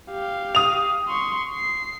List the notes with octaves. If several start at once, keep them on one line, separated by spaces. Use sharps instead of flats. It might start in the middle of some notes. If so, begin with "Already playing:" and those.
G4 F5
D#6 F7
C6 C#6
C7